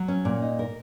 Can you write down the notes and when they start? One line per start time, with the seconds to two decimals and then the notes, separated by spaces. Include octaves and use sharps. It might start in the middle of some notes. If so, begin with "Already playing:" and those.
Already playing: F#3
0.08 C#4
0.25 A#2
0.42 D#4
0.59 A#4